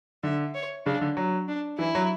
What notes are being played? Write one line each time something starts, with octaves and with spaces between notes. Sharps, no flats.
D3 E5
C#5
C#3 D4
D3
F#3
D4
E3 E4
F#3